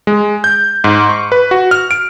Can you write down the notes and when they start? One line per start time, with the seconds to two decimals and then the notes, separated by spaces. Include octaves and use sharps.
0.07 G#3
0.44 G6
0.84 G#2
1.09 C#6
1.32 B4
1.51 F#4
1.71 F6
1.91 D7